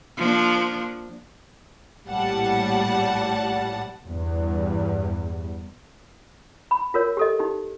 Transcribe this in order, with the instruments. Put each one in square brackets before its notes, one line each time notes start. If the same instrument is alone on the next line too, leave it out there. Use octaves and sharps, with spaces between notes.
[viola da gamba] F3 A#3 D4
[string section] A#1 A2 G3 F#5 A5
[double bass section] E2 G2
[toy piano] B5
F4 A#4 C#5
G4 A4 D#5
D#4 G4